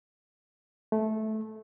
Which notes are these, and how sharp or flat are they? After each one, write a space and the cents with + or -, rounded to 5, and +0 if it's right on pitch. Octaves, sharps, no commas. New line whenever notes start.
A3 -15